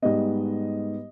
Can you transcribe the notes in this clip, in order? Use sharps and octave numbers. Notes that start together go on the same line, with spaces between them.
G#2 G3 B3 D#5